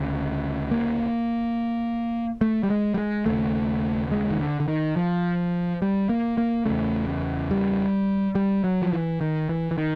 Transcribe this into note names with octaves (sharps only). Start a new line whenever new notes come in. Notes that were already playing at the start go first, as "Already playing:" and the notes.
Already playing: D2 C#3
A#3
A3
G3
G#3
G3
G#3
D#2 C#3 A3
G#3
D#3
D3
D3
D#3
F3
G3
A#3
A#3
E2 C#3 A3
G3
G3
F#3
F3
E3
D#3
E3
E3
D#3